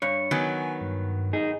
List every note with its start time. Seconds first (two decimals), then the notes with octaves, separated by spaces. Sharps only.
0.02 G2 C#5
0.31 D#3 F#3 B3 G#5
0.81 G2
1.33 D#4 G#4